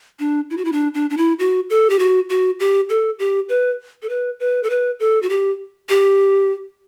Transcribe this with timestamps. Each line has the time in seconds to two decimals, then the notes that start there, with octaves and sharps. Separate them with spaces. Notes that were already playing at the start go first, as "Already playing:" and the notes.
0.20 D4
0.50 E4
0.57 F#4
0.65 E4
0.73 D4
0.94 D4
1.10 D4
1.17 E4
1.39 F#4
1.70 A4
1.90 G4
1.99 F#4
2.30 F#4
2.60 G4
2.89 A4
3.19 G4
3.49 B4
4.02 A4
4.09 B4
4.40 B4
4.63 A4
4.70 B4
5.00 A4
5.22 F#4
5.29 G4
5.89 G4